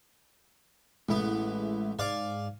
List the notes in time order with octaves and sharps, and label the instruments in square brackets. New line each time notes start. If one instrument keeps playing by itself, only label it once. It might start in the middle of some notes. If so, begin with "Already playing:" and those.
[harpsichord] A1 B3 [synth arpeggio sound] G#3 E4
[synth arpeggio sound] G#2 [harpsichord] D5 F5 G#5